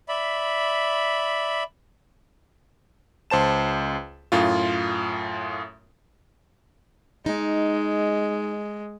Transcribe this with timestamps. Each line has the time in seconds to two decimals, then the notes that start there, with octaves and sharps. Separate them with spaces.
0.08 D5 E5 B5
3.30 C#2 C5 A5 E7
4.32 F#2 A2 F4
7.26 G#3 D#4